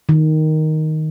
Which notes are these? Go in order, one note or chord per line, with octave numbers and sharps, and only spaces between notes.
D#3